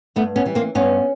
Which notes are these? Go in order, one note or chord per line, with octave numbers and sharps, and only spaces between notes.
G2 A3 B3
B3 C#4
E3 G3
A#3 C4
G2 B3 C#4